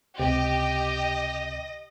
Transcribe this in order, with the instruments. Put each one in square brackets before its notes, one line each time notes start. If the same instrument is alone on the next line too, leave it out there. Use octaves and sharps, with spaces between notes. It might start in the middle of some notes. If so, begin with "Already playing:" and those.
[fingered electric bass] C#2 C4 [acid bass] C3 [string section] G4 [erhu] D#5